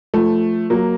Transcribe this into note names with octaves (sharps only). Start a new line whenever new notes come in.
F3 A3
F#3 A#3